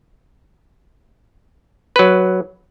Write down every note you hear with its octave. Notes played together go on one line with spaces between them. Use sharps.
F#3 B4